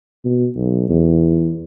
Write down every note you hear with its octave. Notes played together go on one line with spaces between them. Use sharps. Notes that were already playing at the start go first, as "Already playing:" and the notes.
B2
B1
E2